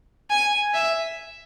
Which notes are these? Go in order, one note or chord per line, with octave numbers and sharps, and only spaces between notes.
G#5
E5